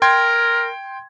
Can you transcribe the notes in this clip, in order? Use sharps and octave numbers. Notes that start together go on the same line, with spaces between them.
A#4 G5 C6 G#6